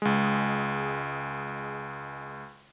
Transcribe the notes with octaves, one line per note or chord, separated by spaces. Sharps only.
C#2 G#3